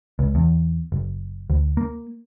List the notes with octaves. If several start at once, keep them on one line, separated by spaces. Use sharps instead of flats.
C#2
E2
F#1
D2
A#3